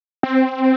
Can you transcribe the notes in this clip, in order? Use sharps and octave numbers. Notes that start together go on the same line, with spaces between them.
C4